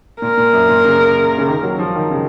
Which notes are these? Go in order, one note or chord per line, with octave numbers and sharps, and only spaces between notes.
A#2 A#4
A#2
F#2
A#2
C#3
C#3
D#3
F#3
F3
D#3
C#3